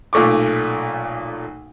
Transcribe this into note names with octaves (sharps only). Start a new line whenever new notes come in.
B1 A#2 A3 C#6 D6